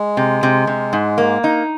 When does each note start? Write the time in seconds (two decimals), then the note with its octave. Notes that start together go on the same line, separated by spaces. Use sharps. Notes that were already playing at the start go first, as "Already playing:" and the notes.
Already playing: G#3
0.17 C3
0.43 C3
0.67 C3
0.93 G#2
1.18 A#3
1.44 D#4